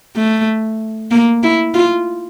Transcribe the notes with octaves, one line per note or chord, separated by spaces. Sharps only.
A3
A#3
E4
F4